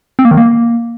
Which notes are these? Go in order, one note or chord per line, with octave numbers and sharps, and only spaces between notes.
C4
A#3
D#3
A#3